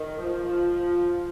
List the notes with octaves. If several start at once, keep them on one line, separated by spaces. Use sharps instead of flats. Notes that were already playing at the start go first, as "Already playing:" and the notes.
Already playing: D#3
F3